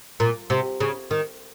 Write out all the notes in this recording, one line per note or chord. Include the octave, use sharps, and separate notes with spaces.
A#2
C3
C#3
D#3